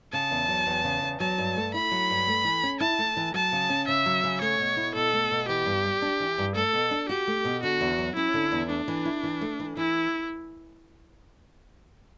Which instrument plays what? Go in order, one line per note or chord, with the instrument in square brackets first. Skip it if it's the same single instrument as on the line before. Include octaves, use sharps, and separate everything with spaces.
[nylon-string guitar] C#3 [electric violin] A5
[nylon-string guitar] E2
F#3
E2
C#3
E2
[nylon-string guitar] F#3 [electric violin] A5
[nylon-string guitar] G2
A3
[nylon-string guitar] E4 [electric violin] B5
[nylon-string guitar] F#3
G2
A3
E3
C#4
[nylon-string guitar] E4 [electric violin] A5
[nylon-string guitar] A3
E3
[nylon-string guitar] F#3 [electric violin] A5
[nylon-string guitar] C#3
C#4
[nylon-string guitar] C#3 [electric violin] E5
[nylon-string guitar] F#3
C#3
[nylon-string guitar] A3 [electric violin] C#5
[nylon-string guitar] B2
E4
[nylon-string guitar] B2 [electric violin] A4
[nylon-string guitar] A3
B2
[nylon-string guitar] E3 [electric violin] G4
[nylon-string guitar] G2
G3
D4
E3
G2
[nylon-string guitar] A3 [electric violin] A4
[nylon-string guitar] B2
D4
[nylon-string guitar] F#4 [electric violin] G4
[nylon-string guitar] A3
B2
[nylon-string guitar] D3 [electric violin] F#4
[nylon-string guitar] E2
F#3
[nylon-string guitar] C#4 [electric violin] E4
[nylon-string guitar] D3
E2
[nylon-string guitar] A3 [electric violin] D4
[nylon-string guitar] E3
E4
E3
A3
E3
[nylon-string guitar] E3 [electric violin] E4